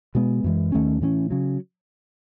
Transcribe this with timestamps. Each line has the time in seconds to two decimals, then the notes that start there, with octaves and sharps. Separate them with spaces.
0.15 B2 G#3 B3
0.44 F#2 E3 G#3
0.72 D#2 D#3 A3 C#4
1.01 A2 E3 A3 C#4
1.30 C#3 F#3